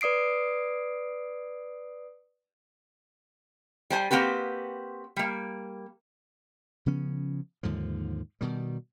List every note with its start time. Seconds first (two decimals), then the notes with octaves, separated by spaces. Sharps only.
0.01 B4 D5 D#6 C7 D7
3.90 G3 C5 G#5
4.11 A#3 C4 F#4 G4 B4
5.16 G3 A#3
6.86 C#3 F3 B3 C#4
7.63 D#2 G#2 D3 F3
8.41 B2 D#3 G3